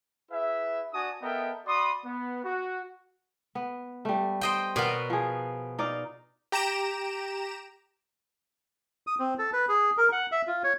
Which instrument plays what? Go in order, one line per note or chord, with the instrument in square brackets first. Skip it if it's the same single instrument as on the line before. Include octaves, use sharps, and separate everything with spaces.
[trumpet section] E4 G#4 B4 E5
D4 F#4 D5 G#5 A5 D#6
B3 A4 A#4 D#5 E5 G5
F#4 D5 B5 C6 D#6
B3
F#4
[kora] B3
G3 A3
[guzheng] C5 D#5 G5
[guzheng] B2 B3 [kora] F#4 A#4 D5
[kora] F3 G#4
D#4 D5 F5
[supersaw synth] G4 A#5 D7 E7
[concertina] D#6
C4
A4
B4
G#4
A#4
F#5
E5
F4
C#5